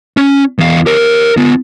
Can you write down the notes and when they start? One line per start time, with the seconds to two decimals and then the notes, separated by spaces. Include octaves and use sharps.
0.17 C#4
0.59 E2 F5
0.86 G4 A#4
1.37 B3 F4